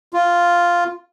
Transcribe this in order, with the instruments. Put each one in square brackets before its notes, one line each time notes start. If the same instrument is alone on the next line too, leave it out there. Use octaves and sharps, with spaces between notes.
[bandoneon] F4